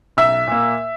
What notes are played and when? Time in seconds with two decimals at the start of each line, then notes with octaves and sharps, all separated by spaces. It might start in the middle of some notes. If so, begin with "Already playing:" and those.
0.17 B1 E5 E6
0.47 A#2 A#3